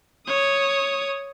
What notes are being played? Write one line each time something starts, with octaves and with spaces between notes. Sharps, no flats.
C#5 D#6